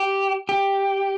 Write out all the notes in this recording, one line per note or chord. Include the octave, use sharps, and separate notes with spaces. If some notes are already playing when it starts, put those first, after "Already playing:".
Already playing: G4
G4